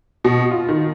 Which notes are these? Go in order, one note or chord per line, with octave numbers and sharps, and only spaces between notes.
B2
F4
D#3